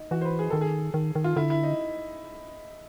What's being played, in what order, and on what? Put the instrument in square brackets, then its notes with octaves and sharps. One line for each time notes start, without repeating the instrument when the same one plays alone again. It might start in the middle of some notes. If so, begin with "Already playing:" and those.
Already playing: [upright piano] D#4
[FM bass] E3 [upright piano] F#4
[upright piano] C5
B4
G#4
[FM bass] D#3 [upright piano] A4
[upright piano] G#4
[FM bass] D#3
D#3
[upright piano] F4
[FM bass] D3 [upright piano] E4
[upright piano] E4
D#4